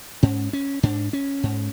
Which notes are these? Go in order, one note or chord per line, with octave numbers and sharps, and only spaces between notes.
G#2 C#4
C#4
G#2 D4
C#4
G#2